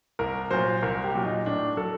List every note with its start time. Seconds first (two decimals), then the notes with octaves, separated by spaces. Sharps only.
0.19 C2 A#4
0.51 A#2 F#3 C5
0.82 C2 A#4
1.04 G4
1.15 A#2 F#3
1.25 D#4
1.45 A2 D4
1.77 F#3 A4